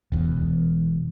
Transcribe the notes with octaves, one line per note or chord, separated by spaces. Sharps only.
E1 E2